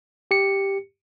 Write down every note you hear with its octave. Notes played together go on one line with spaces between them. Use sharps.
G4 C#7